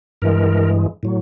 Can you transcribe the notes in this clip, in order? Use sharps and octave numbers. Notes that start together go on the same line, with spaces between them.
G2 E3 G#3 A#4
A2 F#3